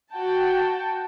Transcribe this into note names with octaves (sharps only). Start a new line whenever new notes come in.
F#4 G5 A5